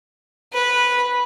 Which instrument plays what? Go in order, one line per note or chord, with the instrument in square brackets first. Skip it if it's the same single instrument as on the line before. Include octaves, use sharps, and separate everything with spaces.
[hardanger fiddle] B4